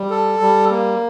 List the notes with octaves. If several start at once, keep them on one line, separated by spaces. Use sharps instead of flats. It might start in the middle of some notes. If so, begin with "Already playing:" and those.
Already playing: G3
A4
G3
A#3